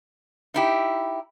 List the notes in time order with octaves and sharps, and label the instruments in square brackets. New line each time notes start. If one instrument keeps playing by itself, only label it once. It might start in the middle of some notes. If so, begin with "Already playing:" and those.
[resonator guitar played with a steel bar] D#4 E4 G4